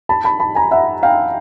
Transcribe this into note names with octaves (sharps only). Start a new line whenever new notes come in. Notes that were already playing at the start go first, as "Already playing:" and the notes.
A5 B5
A5 B5
A5 B5
G#5 A#5
E5 F#5
F5 G5